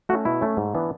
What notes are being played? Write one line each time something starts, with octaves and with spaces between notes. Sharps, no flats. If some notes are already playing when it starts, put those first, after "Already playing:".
A3 C#4 F#4
B2 E4
A3 C#4
G#2
E3 B3 D4